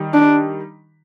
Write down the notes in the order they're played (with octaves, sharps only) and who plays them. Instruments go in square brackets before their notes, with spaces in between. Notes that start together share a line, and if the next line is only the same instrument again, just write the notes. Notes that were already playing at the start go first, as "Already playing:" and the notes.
Already playing: [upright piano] D#3 G3
[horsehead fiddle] D4